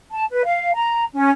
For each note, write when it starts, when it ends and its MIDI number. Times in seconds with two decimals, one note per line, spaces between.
0.12 0.24 81
0.31 0.45 71
0.45 0.71 77
0.75 1.05 82
1.14 1.30 61